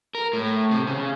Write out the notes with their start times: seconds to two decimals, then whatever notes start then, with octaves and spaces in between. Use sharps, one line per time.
0.15 A#4
0.33 A2
0.71 C3
0.87 C#3